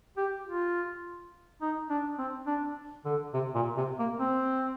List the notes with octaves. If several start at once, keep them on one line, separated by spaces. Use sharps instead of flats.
G4
F4
D#4
D4
C4
D4
D3
C3
A#2
C3
A#3
C4